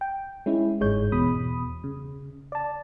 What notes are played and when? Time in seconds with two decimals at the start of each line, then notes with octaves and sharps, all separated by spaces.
0.01 G5
0.46 G#3 C#4 E4
0.80 G1 G#2 G#3 C#5 G6
1.12 E2 B2 B5 D#6
1.84 C#3
2.52 D5 A5